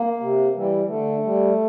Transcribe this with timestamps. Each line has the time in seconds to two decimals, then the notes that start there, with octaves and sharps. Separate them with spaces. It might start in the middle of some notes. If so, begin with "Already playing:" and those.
Already playing: A#3
0.21 C3
0.55 E3 G3
0.88 D3 A3
1.23 G3